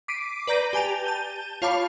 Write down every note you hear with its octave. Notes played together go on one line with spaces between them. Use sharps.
D6 B6 C7 D7 D#7
B4 D5 A#5 G6 A#6 D#7
G4 G#5 A5 F7
A5 G6 D#7 G7
F4 C#5 F5 A5 B5 D6